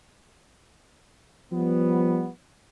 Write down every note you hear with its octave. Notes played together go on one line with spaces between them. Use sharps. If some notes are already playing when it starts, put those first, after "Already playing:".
F3 G3 B3